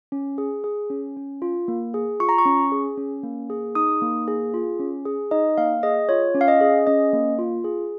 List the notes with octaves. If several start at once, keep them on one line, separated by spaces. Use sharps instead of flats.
C#4
G#4
G#4
C#4
C#4
F4
A#3
G#4
F4 C#6
A#5
C#6
C#4
G#4
C#4
A#3
G#4
D#4 D#6
A#3
G#4
F4
C#4
G#4
D#4 D#5
A#3 F5
G#4 D#5
F4 C#5
C#4
F5
D#5
G#4
C#4 D#5
A#3
F4
G#4